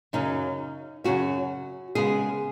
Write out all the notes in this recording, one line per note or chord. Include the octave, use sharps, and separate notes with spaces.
F#2 C#3 F#3 C#4 D#4
F#2 C#3 F#3 C#4 F#4
C#3 G#3 B3 G#4